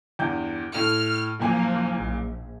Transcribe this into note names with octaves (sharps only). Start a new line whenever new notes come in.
E2 G2 G6
A2 F6
F#1 A#2 F3 A#3 G#5
A#1